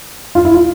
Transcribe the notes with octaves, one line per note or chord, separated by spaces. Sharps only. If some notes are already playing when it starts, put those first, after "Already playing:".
F4
E4
F4